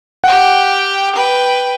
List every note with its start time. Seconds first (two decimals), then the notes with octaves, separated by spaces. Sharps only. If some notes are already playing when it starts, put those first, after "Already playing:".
0.24 G4 F#5 G5
1.15 B4 G5